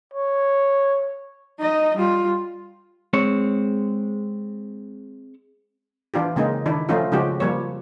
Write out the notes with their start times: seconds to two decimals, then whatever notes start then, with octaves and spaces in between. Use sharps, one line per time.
0.13 C#5
1.59 D#4 D#5
1.97 G3 F4
3.13 G#3 C4 C#5
6.14 E3 D4 F4 G4
6.36 C#3 G#3 A#3 D#4
6.66 D#3 D4 E4
6.89 F3 A3 C#4 D#4 F4
7.12 C#3 F3 G#3 F#4 G4
7.40 F3 G3 A#3 C#5